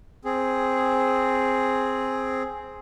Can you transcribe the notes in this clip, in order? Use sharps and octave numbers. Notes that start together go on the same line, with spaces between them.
C4 G#4